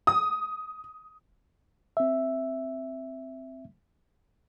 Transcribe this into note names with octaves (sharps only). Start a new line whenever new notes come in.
D#6
C4 E5